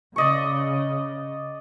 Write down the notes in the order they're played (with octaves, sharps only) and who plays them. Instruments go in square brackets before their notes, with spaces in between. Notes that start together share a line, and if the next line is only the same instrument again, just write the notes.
[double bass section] C#3 [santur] D5 D#5 C#6